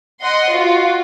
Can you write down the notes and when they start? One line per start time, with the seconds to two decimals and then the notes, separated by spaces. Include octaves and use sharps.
0.21 D#5 F#5 C6
0.53 F4 F#4